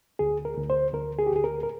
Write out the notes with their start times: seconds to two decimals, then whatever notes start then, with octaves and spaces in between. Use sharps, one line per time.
0.19 D2 G#4
0.45 A#4
0.57 D2
0.70 C5
0.93 D2 A#4
1.19 G#4
1.27 G4
1.31 D2 G#4
1.44 A#4
1.63 A#4